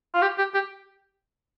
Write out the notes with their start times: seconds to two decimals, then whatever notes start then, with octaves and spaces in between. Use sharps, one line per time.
0.14 F4
0.22 G4
0.38 G4
0.54 G4